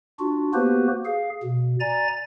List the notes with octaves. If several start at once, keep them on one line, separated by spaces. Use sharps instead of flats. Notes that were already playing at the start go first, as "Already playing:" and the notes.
D4 F4 F#4
A#3 B3 F#4 G4 B4 C5
G#4 F5
B2
D5 G#5 A#5 A6